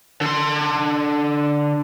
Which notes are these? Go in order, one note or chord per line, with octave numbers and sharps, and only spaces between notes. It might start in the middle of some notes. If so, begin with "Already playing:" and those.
D3 C6